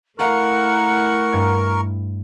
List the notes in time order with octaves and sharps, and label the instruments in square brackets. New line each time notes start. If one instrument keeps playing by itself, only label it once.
[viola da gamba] A3 E4 [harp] A4 F5 [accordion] A#4 C#6 [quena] F#5
[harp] G2 G#6